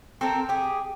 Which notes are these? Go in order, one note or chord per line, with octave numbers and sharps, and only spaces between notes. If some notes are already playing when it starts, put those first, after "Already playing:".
C4 A4 A#4
G4 G#4